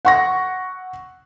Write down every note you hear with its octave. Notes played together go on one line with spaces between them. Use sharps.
F#5 C#6 A#6